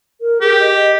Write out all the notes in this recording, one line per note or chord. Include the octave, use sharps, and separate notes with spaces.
A#4
G4 G#4
D#5